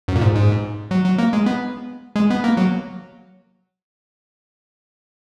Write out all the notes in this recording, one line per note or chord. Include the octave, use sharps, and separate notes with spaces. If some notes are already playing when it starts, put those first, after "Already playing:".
F#2
A#2
G#2
G#2
F#3
F#3
A#3
G#3
B3
G#3
B3
A#3
F#3